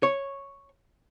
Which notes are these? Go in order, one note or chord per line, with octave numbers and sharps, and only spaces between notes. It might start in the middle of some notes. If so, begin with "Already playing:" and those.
C#5